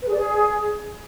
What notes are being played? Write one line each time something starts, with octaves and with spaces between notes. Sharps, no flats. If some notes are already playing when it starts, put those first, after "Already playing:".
B4
G#4
D5
G#4